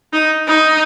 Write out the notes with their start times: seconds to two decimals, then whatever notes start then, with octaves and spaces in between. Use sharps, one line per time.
0.13 D#4
0.48 D#4